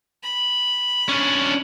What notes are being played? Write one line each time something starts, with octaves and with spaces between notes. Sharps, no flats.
B5
C#4 D4